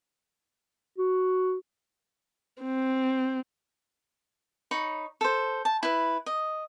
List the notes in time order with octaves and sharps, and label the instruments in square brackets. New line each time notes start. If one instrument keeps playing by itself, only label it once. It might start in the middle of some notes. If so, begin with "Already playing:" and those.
[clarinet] F#4
[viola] C4
[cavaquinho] D#4 C#5 B5
A4 C5
A5
E4 B4
D#5